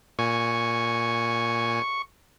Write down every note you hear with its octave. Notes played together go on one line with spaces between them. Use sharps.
A#2 G#5 C#6